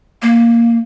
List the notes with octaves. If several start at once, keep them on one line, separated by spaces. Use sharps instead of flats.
A#3